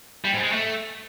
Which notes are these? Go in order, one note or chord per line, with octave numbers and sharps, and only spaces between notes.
G3
G#2
G#3
A3